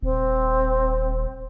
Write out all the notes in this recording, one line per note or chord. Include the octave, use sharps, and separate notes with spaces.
D#1 C4